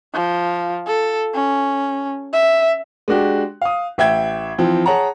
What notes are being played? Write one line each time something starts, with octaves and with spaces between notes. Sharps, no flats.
F3
A4
C#4
E5
G#3 D4 F#4 G4
F5 D#6
A1 E5 G5 G#6
E3 F3 C4
G#4 C#5 F#5 A5 A#5